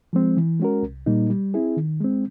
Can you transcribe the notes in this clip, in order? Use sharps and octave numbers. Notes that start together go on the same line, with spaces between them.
F3 G#3 C4
E3
G#3 C#4 F#4 A#4
C2
A#2 G3 A#3 D#4
G3
C4 E4 G#4
D#3
G#3 C4